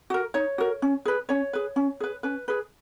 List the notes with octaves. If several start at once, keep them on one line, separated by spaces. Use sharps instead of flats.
F#4 A#4
D#4 C#5
F#4 A#4
C#4
G#4 B4
C#4 C#5
G#4 B4
C#4
G#4 B4
C#4 B4
G#4 B4